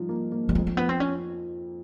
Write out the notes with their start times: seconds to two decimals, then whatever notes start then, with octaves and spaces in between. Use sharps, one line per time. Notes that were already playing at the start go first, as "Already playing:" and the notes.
Already playing: G#2 F3 G3 D#4
0.09 A#3
0.32 A#3
0.49 G3
0.55 F2 G#3
0.67 A3
0.77 F2 B3
0.89 C4
1.00 C#4